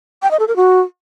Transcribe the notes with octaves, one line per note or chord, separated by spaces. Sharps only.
G5
D#5
A4
A#4
F#4